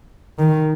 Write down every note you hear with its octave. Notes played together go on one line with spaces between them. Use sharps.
D#3